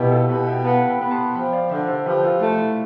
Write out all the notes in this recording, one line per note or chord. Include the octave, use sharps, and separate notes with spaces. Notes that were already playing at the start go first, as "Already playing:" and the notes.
Already playing: B2 E4 G4
F4 A4
B2 G4 B4
E5 G5
B3 F5 A5
G5 B5
B3
A5 C6
F3 G5 B5
D5 F5
D3 C5 E5
A4 C5
F3 G4 B4
F4 A4
A3 F4
E4